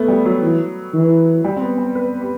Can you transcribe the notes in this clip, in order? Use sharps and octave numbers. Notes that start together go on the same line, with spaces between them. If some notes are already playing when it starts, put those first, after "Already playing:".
Already playing: A3 B3
G3
F#3
E3
E3
G3
C4
B3
C4
B4
G4